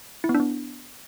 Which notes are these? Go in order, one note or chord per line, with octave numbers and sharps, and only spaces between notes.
E4
B3
D4
B3